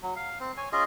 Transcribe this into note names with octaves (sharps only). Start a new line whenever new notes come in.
F#3
F5
C4
C#5 G#5
C#4 F4 G#4 D#5